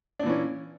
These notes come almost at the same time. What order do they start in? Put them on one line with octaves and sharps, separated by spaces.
D4 A#2 E3 C#4